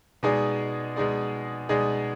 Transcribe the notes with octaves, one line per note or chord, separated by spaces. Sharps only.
B2 G#3 D#4 G#4 D5
B2 G#3 D#4 G#4 D5
B2 G#3 D#4 G#4 D5